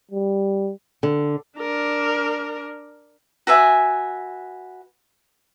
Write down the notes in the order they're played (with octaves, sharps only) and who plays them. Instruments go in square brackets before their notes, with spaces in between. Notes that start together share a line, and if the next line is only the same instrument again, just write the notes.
[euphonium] G3
[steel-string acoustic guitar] D3
[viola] D4 A#4
[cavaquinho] F#4 B4 E5 G#5